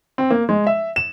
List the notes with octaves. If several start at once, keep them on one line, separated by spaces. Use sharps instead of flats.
C4
A#3
G#3
E5
E7